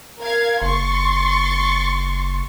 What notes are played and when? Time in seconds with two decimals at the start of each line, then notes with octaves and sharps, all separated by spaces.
0.20 A#4 F5 G#6
0.62 F#1 C6 C#6 A6